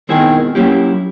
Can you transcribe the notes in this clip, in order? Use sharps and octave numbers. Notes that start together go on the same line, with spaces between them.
B2 D#3 G#3 C4 E4 G#4
F#3 A#3 C#4 E4 G4